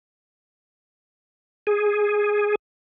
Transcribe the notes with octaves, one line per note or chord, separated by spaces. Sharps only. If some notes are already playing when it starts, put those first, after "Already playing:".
G#4